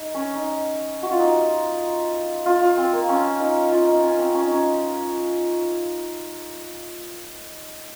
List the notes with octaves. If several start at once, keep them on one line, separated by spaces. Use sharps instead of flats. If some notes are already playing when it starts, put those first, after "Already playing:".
Already playing: D#4
C#4
D#4
F#4
F4
D#4
F4
F4
C4
A#3
C#4
D#4
F4
D#4
C#4
C4
C#4
D#4
C#4